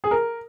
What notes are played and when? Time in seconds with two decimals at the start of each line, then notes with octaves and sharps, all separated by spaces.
0.04 G#4
0.11 A#4